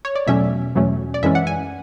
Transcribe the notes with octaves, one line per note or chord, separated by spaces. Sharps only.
C#5
D5
E2 B2 F#3 A3 C#4 E5
E2 B2 F#3 A3 C#4
D5
F#2 E3 G#3 C#4 E5
F#5
G#5